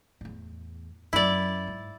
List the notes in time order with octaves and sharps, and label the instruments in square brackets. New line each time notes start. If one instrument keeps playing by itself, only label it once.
[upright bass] E2 A2
[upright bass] F#2 [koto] E4 D5
[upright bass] G#2